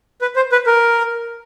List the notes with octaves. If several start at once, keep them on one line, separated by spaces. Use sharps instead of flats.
B4
C5
B4
A#4